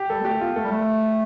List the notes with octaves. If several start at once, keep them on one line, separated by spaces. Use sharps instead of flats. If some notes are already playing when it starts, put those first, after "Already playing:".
Already playing: G4
G3 A4
B3
A3 G4
B3 F4
A3 A4
G3
A3